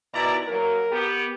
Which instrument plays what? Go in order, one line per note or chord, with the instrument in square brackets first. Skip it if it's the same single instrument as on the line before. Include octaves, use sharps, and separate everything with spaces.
[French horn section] D#2 E4 D5 [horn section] B2 A#5
[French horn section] F#3 A#3 [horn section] A#4
[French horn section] B3 G4